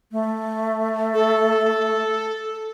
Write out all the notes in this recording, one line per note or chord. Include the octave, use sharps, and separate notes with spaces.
A3
A4